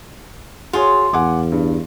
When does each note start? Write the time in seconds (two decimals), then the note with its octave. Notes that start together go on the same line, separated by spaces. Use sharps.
0.73 F4 F#4 G#4 C#5
1.13 E2 F#5 G#5 D6
1.52 G2